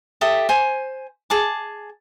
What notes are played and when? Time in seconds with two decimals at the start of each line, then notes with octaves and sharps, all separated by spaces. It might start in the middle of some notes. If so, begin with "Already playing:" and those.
0.21 G4 A4 E5 D#6
0.49 C5 G#5
1.30 G#4 A5 D6